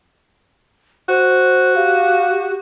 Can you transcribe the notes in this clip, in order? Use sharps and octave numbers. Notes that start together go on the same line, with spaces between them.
F#4 C5
G4 F5